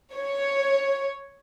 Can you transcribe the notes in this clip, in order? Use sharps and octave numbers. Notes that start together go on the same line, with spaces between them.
C#5